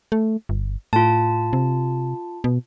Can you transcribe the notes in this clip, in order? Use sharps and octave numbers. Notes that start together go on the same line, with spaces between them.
A3
G1
A2 F4 A5
C3
B2